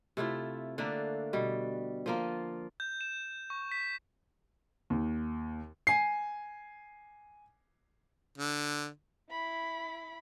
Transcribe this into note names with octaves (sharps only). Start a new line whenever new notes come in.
C3 A3 E4 F4
D3 A3 A#3 D4
B2 G3
F3 A#3 F4
G6
E7
C#6
B6
D#2
G#5 C7
D3
E4 B5